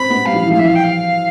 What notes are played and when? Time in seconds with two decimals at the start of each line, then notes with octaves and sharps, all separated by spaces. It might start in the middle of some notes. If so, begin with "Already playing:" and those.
Already playing: C4 B5
0.10 B3
0.26 G3 F5
0.34 F3
0.43 E3
0.51 F3 F5
0.59 E3 E5
0.67 F5
0.76 G5
0.84 F5